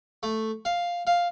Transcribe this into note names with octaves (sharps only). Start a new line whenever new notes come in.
A3
F5
F5